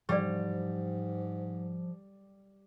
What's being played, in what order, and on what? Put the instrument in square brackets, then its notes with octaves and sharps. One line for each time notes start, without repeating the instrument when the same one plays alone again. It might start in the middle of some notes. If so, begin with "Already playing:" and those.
[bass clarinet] G#2 [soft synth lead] F3 [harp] G3 [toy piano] D5 F5 C#6